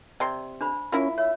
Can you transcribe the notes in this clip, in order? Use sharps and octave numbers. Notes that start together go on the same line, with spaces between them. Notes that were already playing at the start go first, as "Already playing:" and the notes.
C3 D5 C6
D4 C5 B5
A#3 C#4 E4 F4
C#5 E5